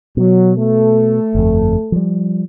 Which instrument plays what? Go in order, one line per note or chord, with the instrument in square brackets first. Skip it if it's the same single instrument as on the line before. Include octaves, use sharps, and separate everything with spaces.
[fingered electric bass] B2 [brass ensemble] F#3
[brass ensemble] A3 A4
[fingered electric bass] G1 F2
F3 G3